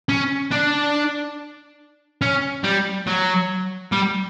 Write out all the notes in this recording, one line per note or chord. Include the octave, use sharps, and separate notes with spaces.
C#4
D4
C#4
G3
F#3
G3